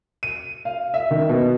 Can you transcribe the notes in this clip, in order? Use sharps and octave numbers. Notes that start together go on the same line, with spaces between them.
D#7
F5
E5
D#3
B2